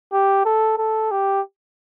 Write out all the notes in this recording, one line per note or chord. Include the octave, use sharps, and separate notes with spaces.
G4
A4
A4
G4